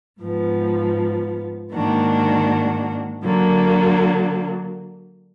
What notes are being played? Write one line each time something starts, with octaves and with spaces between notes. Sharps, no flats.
G#2 F3 B3
G#2 D#3 A#3 D4 F#4
D3 F#3 A#3 D4